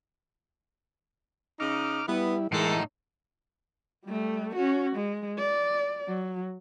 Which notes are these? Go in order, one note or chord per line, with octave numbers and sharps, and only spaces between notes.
C#3 D#4 D6 F6
G3 B3 E4
A2 E3 G#3 A#3 D#4 A4
G3 A3
C#4 F#4
G#3
D5
F#3